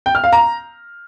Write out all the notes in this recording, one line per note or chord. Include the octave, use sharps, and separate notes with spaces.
G5
F6
F5
A#5